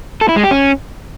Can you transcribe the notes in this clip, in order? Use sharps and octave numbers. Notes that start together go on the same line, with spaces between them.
A4
E4
G#3
G4
C#4